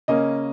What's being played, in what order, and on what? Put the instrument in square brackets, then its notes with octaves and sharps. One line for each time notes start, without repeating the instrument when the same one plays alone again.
[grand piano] C#3 A#3 C#4 D#5